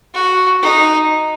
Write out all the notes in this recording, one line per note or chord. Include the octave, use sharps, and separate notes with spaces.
F#4
D#4